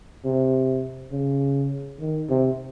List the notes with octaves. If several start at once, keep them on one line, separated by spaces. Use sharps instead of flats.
C3
C#3
D#3
C3